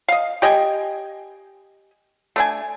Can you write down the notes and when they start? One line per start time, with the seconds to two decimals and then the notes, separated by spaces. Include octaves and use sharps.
0.08 D#5 F5
0.42 G4 D#5 G5 G#5
2.36 A3 D4 G#5